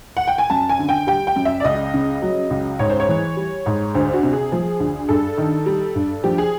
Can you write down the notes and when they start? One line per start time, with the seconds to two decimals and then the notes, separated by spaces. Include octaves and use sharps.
0.17 F#5
0.27 G5
0.38 G#5
0.50 F#2 A5
0.69 G#5
0.79 D3
0.89 G5
1.07 G3 G5
1.27 G5
1.36 F#2
1.45 E5
1.60 D5
1.64 C#2 D#5
1.94 C#3
2.22 F#3
2.50 C#2
2.79 G#2 C#5
2.90 C5
3.00 C#5
3.09 E3
3.37 G3
3.66 G#2
3.94 D2 C5
4.13 F#4
4.23 C3
4.33 G#4
4.52 F3
4.80 D2
5.09 G2 A4
5.38 D#3
5.66 G3
5.95 G2
6.24 F3 G4
6.38 G#4